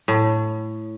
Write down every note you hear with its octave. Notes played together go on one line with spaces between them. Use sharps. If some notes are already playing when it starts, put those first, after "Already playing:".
A2